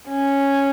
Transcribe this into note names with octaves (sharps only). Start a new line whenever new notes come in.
C#4